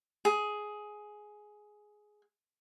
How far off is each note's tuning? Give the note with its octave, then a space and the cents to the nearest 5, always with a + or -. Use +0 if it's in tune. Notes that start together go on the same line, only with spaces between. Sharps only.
G#4 +10